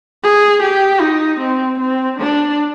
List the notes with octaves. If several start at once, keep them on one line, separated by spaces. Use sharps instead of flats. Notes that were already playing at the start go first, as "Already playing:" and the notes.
G#4
G4
D#4
C4
C4
D4